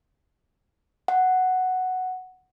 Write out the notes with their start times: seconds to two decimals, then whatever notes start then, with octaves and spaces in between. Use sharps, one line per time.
1.08 F#5